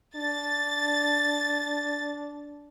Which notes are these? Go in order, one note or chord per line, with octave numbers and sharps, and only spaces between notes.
D4 A6